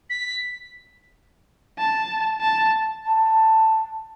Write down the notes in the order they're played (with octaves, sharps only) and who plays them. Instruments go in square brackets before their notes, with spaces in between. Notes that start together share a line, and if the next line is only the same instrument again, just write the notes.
[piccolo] B6
[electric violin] A5
A5
[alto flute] A5